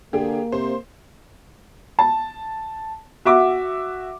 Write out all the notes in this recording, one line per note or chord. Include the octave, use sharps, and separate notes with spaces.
D3 A#3 G4 G#4
C3 C5
A5
F#4 E5 F#5 D6